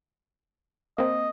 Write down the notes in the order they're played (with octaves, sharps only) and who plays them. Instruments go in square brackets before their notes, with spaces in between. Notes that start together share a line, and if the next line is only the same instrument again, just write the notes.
[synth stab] A#3 C4 [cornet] D#5